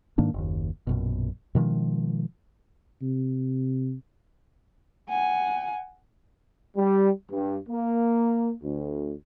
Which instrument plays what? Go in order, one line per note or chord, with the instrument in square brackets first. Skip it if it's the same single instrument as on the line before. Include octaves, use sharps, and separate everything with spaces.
[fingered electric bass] G#2 D#3 A#3 D4
F#1 D#2
A#1 F#2 B2
B2 D#3 F3 G#3
[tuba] C3
[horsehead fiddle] F#5 G#5
[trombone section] G3
G2
A#3
D2